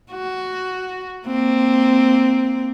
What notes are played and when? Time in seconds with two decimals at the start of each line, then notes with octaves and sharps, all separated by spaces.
0.12 F#4
1.27 A#3 C4